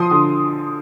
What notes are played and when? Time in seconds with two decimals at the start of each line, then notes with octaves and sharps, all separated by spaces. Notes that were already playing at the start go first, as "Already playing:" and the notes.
Already playing: F3 C6 D#6
0.11 D3